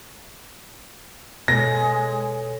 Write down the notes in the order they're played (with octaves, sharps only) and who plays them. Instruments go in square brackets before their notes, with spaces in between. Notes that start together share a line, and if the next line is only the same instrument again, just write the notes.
[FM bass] B2 [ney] G#3 [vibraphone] A4 B4 C#5 [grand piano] A#6